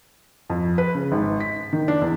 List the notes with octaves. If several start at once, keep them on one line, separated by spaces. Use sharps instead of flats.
F2
B4
C#3
G#1
B6
D#3
D4
E2